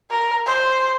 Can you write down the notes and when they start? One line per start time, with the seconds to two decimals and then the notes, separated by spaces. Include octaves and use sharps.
0.11 A#4
0.46 C5